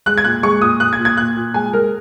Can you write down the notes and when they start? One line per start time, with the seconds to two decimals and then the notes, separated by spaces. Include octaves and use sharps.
0.06 G#3 F#6
0.18 G#6
0.24 A#2 F#6
0.43 G#3 C#6
0.62 A#2 D#6
0.80 A#2 F#6
0.93 G#6
0.99 A#2
1.05 G#6
1.17 A#2 F#6
1.36 A#2
1.54 G#3 G#5
1.73 G#3 A#4